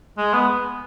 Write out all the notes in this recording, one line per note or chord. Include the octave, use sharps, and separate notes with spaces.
G#3
B3